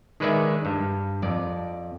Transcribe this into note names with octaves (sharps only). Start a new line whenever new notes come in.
D#3 G#3 B4 D5 E5
G2
F2 D5